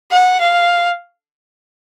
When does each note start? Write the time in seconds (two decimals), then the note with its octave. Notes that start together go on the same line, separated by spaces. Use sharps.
0.11 F#5
0.40 F5